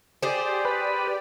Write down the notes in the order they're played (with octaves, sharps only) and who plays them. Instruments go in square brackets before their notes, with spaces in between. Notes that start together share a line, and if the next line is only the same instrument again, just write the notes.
[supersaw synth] G4 D5 [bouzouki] G#4 C5
[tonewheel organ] B4